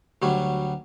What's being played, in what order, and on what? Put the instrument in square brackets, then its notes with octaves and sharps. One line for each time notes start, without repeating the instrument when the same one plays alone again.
[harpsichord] D2 F#3 G3 C#5